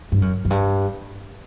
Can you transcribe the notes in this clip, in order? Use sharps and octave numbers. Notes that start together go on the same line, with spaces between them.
G2
F#2
F#2
G2